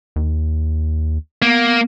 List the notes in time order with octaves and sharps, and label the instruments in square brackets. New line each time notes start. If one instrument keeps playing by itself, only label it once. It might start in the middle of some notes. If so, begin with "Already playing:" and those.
[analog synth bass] D#2
[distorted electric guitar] A#3 [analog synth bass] B3